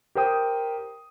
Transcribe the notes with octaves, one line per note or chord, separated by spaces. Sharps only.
G4 A#4 C5 G5 D#6